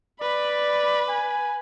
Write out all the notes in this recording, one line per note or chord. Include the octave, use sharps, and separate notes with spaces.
B4 D5 B5
G#5